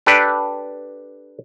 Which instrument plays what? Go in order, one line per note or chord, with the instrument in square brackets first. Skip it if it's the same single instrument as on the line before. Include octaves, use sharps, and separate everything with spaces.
[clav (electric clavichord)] D4 G4 A4 B4 D5